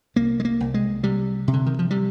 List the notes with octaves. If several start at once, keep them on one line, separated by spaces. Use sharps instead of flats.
C2 A#3
G#3
A#3
C2
G#3
C3 G3
C3
D3
D#3
F3
C3 G3